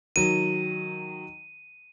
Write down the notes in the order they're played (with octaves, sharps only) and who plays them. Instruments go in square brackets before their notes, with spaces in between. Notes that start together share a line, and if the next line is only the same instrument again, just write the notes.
[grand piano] D#3 F#3 [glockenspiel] D#7